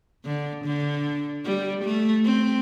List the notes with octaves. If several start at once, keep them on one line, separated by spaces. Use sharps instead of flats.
D3
D3
G3
A3
C4